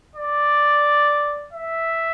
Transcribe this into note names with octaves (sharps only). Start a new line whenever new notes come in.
D5
E5